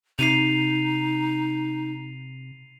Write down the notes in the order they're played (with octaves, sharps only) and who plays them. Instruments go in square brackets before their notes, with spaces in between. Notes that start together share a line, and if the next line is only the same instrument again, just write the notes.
[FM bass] C3 [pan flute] D#4 [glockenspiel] C7 D#7 F7